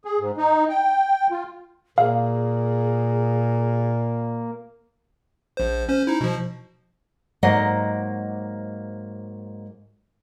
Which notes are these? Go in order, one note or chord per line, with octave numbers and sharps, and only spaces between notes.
G#4
G#2
D#4
G5
F4
A#2 A#3 G#4 F5
A#1 C5
C#4 C5
D#4 E4
B2 F3
G#2 F#3 A#3 C5 D#5 F#5